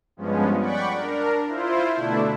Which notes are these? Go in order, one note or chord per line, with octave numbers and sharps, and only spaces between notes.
G2 F3 G#3 B3 C#4
D5 F#5 G5 B5 C#6
D4 A#4
E4 F4 C5
B2 D3 A3 D4 E4